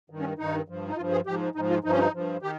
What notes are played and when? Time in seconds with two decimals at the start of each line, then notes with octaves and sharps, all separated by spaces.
0.10 G2 D#3
0.19 C#4
0.39 G2 D#3 D#4
0.68 G2 F3
0.88 D#4
0.97 G2 F3 F4
1.12 G#4
1.26 G#2 F3 G4
1.55 G#2 F3 D#4
1.70 F4
1.84 G2 F3 D#4
1.92 C#4
1.99 D#4
2.14 G2 F3
2.42 D#3 G4